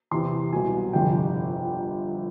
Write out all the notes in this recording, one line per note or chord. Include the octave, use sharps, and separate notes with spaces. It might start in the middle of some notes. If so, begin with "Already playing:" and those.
E2 C3 E3 C6
C2 B2 F#3 G#5
G1 F2 C3 G5